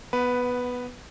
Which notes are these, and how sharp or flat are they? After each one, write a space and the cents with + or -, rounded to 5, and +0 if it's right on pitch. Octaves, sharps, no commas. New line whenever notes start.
B3 +0 B4 +0 F#5 -25